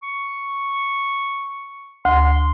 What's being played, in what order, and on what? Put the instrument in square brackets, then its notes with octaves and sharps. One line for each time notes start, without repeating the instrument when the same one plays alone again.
[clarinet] C#6
[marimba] D2 [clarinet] C6